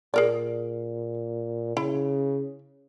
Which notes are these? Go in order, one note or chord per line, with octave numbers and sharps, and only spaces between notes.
A#2 G#4 A#4 D5
C#3 E4